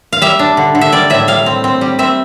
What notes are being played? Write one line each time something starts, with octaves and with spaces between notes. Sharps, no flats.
F5
G3 E5
D4
D3
D3
E5
G3 D5
A2 E5
G3 F5
C4
C4
G3
C4 E5